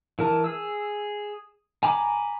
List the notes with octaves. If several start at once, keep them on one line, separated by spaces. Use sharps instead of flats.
E3 A#4 A5
G#4 E6
G#5 A#5 B5 D6